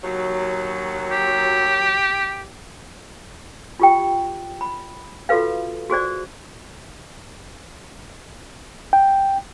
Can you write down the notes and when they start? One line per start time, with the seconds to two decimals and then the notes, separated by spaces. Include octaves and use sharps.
0.04 D#2 F#3
1.11 G4
3.80 F4 G4 G5
4.61 B5
5.29 F4 F#4 A4 B4 F5
5.90 F#4 G#4 C5 D5
8.93 G5